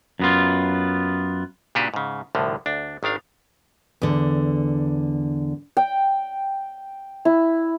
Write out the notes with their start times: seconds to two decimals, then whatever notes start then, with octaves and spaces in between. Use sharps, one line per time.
0.20 F#2 B3 F4
1.75 A#2 C#3 D4 F#4 G4 B4
1.94 G#2 C#3
2.35 C2 A2 D3 F3
2.66 D2 D4
3.03 G#1 D#3 D4 F5
4.02 E2 D3
5.77 G5
7.25 E4